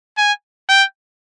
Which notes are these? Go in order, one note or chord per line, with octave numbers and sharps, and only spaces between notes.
G#5
G5